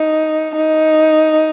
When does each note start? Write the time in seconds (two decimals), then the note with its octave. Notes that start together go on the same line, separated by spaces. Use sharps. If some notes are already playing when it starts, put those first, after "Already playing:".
Already playing: D#4
0.57 D#4